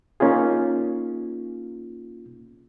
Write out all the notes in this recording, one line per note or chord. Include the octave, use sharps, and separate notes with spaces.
A#3 C#4 D#4 F4 G#4